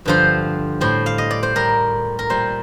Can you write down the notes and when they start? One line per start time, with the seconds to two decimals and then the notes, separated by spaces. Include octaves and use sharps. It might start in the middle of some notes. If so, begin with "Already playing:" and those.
0.05 G2 D3 F3 C5
0.81 A2 G3 C5
1.06 F5
1.18 D#5
1.31 D5
1.43 C5
1.55 A2 G3 A#4
2.19 A#4
2.30 A#2 G3 C5